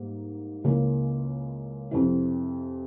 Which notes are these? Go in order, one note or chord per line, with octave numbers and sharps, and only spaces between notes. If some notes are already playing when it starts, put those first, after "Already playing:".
Already playing: G#2 G3 A#3
C#2 C#3 E3 A#3
F2 C3 E3